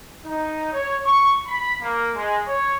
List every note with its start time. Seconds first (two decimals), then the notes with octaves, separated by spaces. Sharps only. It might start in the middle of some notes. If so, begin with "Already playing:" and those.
0.25 D#4
0.73 C#5
1.05 C#6
1.47 B5
1.82 A#3
2.15 G#3
2.47 C#5